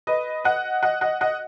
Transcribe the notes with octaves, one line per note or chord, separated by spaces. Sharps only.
B4 D#5
D#5 F#5
D#5 F#5
D#5 F#5
D#5 F#5